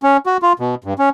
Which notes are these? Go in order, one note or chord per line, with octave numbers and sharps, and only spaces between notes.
C#4
F#4
F4
B2
G2
C#4